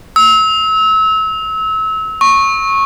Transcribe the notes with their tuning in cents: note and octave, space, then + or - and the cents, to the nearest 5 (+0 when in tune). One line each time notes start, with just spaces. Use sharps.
E6 -30
C#6 -15